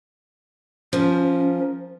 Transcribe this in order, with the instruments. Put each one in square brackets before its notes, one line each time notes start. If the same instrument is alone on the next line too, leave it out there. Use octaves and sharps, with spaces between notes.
[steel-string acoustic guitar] F3 A#4 [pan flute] C#4